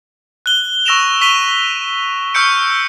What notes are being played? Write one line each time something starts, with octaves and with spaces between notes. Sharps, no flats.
F#6 G7
C#6 E6 A#6 D7 E7 F7
C#6 B6 D#7 F7 G7
C#6 E6 F6 G6 C#7 D7
E6